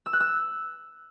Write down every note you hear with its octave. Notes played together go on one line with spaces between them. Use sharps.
E6
F#6
E6